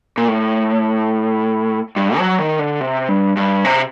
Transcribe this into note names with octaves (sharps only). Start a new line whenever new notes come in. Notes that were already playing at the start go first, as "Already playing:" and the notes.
A#2
A2
G2
F#3
D#3
D3
C3
G2
G2
C3